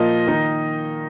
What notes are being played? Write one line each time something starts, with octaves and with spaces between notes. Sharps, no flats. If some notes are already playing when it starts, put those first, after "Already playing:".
Already playing: A#2 F3 A#3 F4 D#5
D#3 A#3 D#4